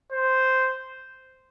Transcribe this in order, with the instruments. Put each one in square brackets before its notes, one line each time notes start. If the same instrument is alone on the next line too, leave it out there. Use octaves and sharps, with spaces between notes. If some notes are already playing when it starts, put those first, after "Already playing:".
[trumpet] C5